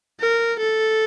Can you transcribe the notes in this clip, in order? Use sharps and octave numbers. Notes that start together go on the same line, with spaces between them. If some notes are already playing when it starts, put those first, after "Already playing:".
A#4
A4